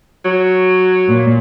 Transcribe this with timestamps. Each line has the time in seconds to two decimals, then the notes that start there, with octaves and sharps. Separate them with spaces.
0.25 F#3
1.08 A#2 A#3